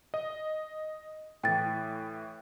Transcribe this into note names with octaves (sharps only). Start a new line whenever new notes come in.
D#5
A2 E3 G5 A6